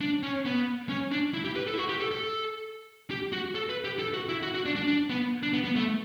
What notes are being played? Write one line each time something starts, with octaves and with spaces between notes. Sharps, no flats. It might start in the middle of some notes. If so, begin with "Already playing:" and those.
D4
C#4
B3
C#4
D4
E4
G4
B4
A4
E4
F#4
G4
A4
A4
G4
F#4
A4
B4
G4
A4
F#4
E4
F#4
F#4
D4
D4
D4
B3
D4
B3
B3
A3